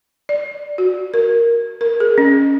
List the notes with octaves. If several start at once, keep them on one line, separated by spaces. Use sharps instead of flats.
D5
F#4
A#4
A#4
G#4
C#4